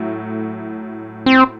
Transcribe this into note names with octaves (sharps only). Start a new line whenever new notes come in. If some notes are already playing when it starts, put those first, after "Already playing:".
Already playing: A2 F#3 A3
C4